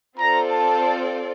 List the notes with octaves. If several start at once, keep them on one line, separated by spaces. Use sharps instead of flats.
C4 F4 A4 D5 A#5
A5